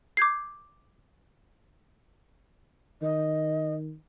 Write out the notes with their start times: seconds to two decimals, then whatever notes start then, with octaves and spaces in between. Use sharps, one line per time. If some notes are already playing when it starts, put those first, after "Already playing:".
0.17 D6 G6 G#6 C7
3.02 D#3 D#5